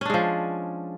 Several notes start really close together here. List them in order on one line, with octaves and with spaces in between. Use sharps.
C#4 D4 G#3 F3